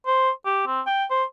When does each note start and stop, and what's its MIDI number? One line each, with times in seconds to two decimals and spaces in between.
0.06 0.30 72
0.45 0.63 67
0.66 0.81 60
0.86 1.05 79
1.10 1.24 72